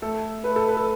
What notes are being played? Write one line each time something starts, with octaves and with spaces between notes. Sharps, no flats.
A3 A4
A3 B4
A4
B4
A4